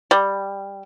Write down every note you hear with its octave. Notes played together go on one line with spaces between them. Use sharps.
G3